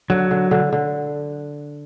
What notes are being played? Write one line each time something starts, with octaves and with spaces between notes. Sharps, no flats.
D3 F#3
D3
D3
D3